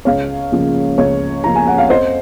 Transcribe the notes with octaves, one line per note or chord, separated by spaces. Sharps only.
C#2 C#5 F5
C#3 F3 A#3
C#2 C#5
C#3 F3 A#3 A#5
G#5
F#5
F5
F2 C5 D#5